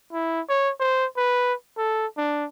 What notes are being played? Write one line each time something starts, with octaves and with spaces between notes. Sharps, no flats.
E4
C#5
C5
B4
A4
D4